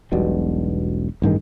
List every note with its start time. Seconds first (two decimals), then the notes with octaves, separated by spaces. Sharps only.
0.12 E1 B1 B2 G3
1.22 A1 G2 D#3 G#3